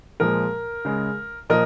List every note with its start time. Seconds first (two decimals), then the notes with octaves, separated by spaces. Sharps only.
0.20 A#2 F3 G#3 A#4
0.85 C#3 G#3
1.50 A#2 F3 A#4 D#5